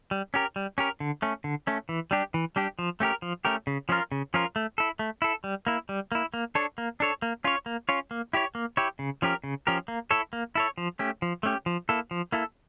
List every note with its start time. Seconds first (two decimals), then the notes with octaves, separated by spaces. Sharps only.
0.11 G3
0.34 C#4 G4 A#4
0.56 G3
0.78 C#4 G4 A#4
1.00 D3
1.22 A3 C#4
1.44 D3
1.67 A3 C#4
1.89 E3
2.11 G3 D4 G4
2.34 E3
2.56 G3 D4 G4
2.79 F3
3.00 A3 C#4 G4 A#4
3.22 F3
3.45 A3 C#4 G4 A#4
3.67 C#3
3.89 F3 C#4 F4 A#4
4.12 C#3
4.34 F3 C#4 F4 A#4
4.56 A3
4.78 E4 A4
4.99 A3
5.22 E4 A4
5.44 G3
5.67 A#3 E4
5.89 G3
6.12 A#3 E4
6.34 A#3
6.55 D4 A4 C#5
6.78 A#3
7.00 D4 A4 C#5
7.22 A#3
7.44 C#4 F4 C#5
7.66 A#3
7.89 C#4 F4 C#5
8.11 A#3
8.33 E4 G4 C#5
8.55 A#3
8.77 E4 G4 C#5
8.99 C#3
9.22 F3 C#4 G4 A#4
9.44 C#3
9.67 F3 C#4 G4 A#4
9.88 A#3
10.11 E4 A4 C#5
10.33 A#3
10.55 E4 A4 C#5
10.78 F3
10.99 A3 C#4 G4
11.22 F3
11.43 A3 C#4 G4
11.66 F3
11.89 A#3 E4 A4
12.11 F3
12.32 A#3 E4 A4